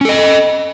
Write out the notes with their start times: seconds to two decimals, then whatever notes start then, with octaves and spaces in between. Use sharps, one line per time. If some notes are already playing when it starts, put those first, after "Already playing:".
0.01 C#4
0.05 A4
0.09 D#5